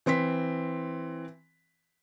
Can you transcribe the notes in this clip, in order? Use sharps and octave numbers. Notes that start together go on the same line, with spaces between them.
E3 C4 C6 B6